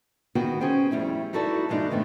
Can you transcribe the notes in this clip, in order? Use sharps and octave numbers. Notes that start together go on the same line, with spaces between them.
D2 D#3 B3 F#4 G#4 G5
C#4 G#4 C5 G5
F2 G3 A3 E4
D#4 E4 F#4 A4 B4 D5
G2 E3 G#3 D4 D#4
G#2 D#3 A3 B3